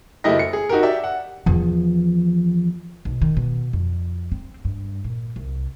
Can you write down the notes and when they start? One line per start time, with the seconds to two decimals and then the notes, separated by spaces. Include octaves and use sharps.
0.24 F#1 A3 E4 G4 D#5 A#6
0.39 C#7
0.53 G#4
0.69 D#4 F#4 G4 A#4
0.83 G4 D5 E5
1.04 F#5
1.46 E2 F3
3.05 B1
3.22 D#3
3.37 B2
3.73 F2
4.32 C4
4.65 G2
5.04 A#2
5.36 C2